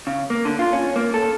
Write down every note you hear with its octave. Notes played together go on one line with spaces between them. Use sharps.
C#3
A#3
D3
F4
C#4
A#3
A4